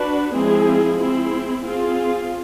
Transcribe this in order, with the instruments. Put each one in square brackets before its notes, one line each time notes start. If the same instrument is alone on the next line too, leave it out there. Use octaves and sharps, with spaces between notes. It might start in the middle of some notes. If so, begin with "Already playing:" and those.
Already playing: [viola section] D4 F#4 B4
F3 G#3 C4 E4 G#4
C4 E4 G#4
C4 F4 G#4